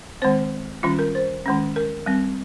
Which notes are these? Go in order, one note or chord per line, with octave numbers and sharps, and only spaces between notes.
D#3 G#3 C4 C5
D#3 G3 C#4 F4
A#4
C5
D#3 G#3 C#4
A#4
G3 C4